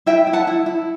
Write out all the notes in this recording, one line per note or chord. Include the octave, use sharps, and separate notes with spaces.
E4 E5 G5
E4
F#5 A5
E4
E4